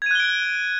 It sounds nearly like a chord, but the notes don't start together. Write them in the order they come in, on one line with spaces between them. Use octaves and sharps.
G#6 D#7 F#6 G7 D7